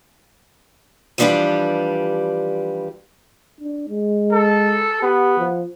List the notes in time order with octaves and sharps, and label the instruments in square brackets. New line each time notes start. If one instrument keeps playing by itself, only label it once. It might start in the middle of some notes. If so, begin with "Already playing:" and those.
[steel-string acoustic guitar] E3 F3 G3 D4 G4 B4
[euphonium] D4
G#3
[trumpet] A4
[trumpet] B3 [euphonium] G4
[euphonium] F3